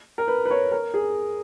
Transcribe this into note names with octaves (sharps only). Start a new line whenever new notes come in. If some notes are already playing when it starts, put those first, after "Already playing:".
A#4
B4
B4
C#5
A#4
G#4